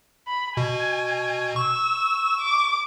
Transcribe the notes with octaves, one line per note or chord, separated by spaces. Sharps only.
B5
B2 G#5
C#6 E6
D6